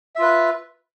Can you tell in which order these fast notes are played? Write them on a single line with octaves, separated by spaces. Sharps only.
E5 F4 B4